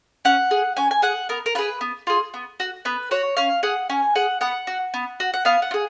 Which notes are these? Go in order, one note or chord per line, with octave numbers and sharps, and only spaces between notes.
C#4 F#5
G#4
C#4 G#5
G#5
G#4 F#5
B3 A#4
A#4
F4 G#4 B4
B3
F4 G#4
B3
F#4
B3 B4
F#4 C#5
C#4 F5
G#4 F#5
C#4 G#5
G#4 F#5
B3 F#5
F#4
B3
F#4
F#5
B3 F5
F#5
F4
G#4